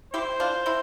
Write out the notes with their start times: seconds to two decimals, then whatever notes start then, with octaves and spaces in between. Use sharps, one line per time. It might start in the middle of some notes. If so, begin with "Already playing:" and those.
0.13 E4 G4 C5
0.40 D4 F4
0.66 C4 E4